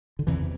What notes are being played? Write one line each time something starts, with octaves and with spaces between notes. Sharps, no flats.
D3
E2 C3 E3